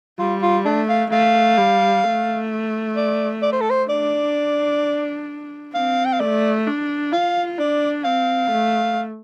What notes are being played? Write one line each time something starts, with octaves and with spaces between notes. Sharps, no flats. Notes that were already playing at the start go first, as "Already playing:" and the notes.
G3 F4
F4
A3 D4
F5
A3 F5
G3
A3
D5
D5
C5
A4
C5
D4 D5
C4 F5
G5
F5
A3 D5
D4
F4 F5
D4 D5
C4 F5
A3